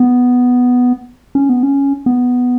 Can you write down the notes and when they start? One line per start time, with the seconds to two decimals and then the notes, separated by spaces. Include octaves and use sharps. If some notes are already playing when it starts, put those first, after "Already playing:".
Already playing: B3
1.35 C#4
1.49 B3
1.63 C#4
2.06 B3